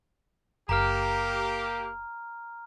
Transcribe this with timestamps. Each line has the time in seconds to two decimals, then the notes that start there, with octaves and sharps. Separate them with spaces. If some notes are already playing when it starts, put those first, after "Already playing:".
0.69 F#1 A#3 G4 A#5 F6